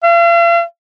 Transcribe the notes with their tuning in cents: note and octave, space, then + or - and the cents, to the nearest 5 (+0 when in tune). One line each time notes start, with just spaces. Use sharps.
F5 -45